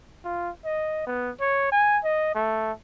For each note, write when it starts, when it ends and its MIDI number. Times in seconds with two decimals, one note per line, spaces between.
0.25 0.50 65
0.65 1.03 75
1.07 1.31 59
1.41 1.72 73
1.72 1.99 80
2.04 2.31 75
2.35 2.72 57